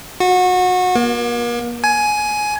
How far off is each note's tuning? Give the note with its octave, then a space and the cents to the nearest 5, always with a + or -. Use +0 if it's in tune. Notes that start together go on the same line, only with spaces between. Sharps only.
F#4 -25
A#3 +40
G#5 +15